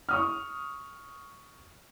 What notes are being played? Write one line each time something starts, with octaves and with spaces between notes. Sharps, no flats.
C#6 D#6 F6